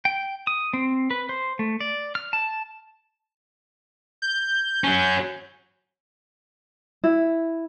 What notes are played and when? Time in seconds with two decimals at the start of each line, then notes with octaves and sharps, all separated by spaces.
0.05 G5
0.47 D#6
0.73 C4
1.11 B4
1.29 C5
1.59 A3
1.80 D5
2.15 F6
2.33 A5
4.22 G6
4.84 F#3 C#4
7.04 E4